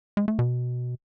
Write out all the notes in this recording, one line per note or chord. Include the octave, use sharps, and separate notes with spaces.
G#3
A3
B2